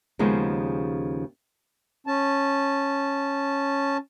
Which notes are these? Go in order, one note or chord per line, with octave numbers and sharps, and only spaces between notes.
D#2 C#3 F3 G#3 B3
C#4 A5